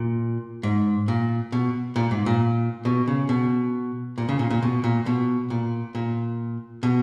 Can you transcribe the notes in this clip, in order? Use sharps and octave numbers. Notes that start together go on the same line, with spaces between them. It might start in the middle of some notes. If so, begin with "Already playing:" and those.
Already playing: A#2
G#2
A#2
B2
A#2
G#2
A#2
B2
C#3
B2
A#2
C#3
A#2
A#2
B2
A#2
B2
A#2
A#2
B2